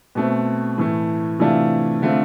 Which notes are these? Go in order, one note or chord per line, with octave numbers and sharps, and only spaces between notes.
B2 A3 C4
A2 E3 A3
C3 E3 A3 D4 F4
D3 A3 C4 F4